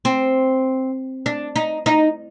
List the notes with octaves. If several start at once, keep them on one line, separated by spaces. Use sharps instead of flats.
C4
D4
D#4
D#4